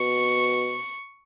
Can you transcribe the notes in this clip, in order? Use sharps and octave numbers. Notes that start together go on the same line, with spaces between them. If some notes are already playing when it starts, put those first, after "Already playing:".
Already playing: B2 C#6